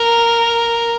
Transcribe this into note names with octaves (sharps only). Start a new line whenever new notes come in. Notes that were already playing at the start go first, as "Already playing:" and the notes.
Already playing: A#4